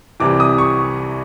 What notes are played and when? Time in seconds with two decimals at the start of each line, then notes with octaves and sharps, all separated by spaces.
0.20 C2 C3 E3 D6
0.40 D#6
0.58 C#6